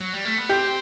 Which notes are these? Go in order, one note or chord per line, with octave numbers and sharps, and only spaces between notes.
F#3
G3
A3
B3
C4 G4